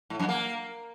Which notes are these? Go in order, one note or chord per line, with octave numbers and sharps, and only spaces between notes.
A2
F#2
A#3